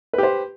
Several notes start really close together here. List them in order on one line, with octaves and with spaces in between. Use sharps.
B4 G4 C5